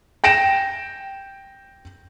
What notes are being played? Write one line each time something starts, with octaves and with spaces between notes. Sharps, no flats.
G5 A#6 D7 E7